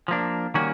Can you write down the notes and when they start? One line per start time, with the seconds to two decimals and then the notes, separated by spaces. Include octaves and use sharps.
0.08 F3 A#3 D4
0.54 D#3 G3 A#3 C#4 F#4